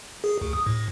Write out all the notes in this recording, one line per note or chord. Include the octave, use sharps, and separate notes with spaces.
G#4
D2
D#6
A2